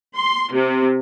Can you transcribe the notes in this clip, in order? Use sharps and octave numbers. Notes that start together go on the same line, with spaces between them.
C6
C3